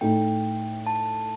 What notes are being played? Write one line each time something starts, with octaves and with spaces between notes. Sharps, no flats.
A2 A3 D#4 G5
A5